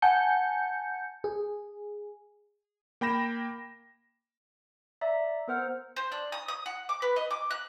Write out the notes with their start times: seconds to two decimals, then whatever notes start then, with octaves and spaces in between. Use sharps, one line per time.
0.02 F#5 G#5 A5 G6 C#7
1.24 G#4
3.01 A#3 G5 B5 A#6 E7
5.01 D5 E5 A#5
5.48 B3 A#4 C5 F#5 F6
5.96 C5
6.12 D4
6.32 D#6
6.48 D#6
6.66 F#5
6.89 D6
7.02 B4
7.16 D#5
7.31 D6
7.51 F#6